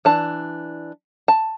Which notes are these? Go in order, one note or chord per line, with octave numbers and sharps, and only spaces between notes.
E3 D4 A5
A5